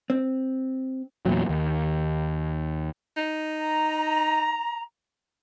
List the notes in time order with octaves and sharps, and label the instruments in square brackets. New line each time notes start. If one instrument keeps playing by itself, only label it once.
[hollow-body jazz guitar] C4
[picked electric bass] E2 A#2 F#3
D#2
[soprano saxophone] D#4
[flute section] A#5